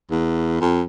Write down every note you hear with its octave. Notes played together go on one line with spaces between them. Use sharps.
E2
F2